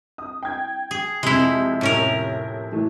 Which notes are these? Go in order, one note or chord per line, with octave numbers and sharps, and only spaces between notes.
D#6
G5 G#6
G#4
F2 C3 G#3 E4
A2 C#4 A#4
E3 A3